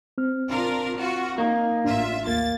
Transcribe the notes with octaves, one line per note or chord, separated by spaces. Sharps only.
C4 F6
D4 F4 A#4
F4 F#4
A#3 D#4
A1 D4 F4 E5
D#2 A#3 A6